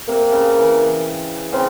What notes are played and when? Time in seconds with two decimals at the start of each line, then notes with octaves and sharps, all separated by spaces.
0.08 C3 A#3
0.32 C#3
0.57 E3
1.53 C#3 C4